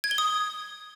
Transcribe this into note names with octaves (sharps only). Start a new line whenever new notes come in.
G#6
G7
D#6